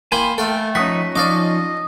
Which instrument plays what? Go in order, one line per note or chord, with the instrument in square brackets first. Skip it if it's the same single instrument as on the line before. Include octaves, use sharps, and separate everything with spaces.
[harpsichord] A#3 E4 G5 [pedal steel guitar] G#5 B5 C6
[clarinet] A3 [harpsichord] A4 F5 [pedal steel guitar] G5
[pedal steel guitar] F3 D#4 C#6 [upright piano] C#4 D#6 B6 [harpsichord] F#5
[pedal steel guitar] F3 C#4 D#4 [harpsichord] D5 F5 D6 [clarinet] D#5 [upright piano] C#6